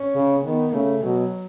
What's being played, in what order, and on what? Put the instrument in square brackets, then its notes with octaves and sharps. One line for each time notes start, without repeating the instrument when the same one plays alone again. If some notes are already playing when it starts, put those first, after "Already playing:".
Already playing: [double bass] C#4
[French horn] C#3
[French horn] D#3 [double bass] B3
[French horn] C#3 [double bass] A3
[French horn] B2 [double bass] F#3